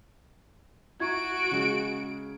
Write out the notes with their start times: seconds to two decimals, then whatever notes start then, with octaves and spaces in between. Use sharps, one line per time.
1.00 E4 F#4 A#5 C#6 G#6 D7
1.51 C#3 G#3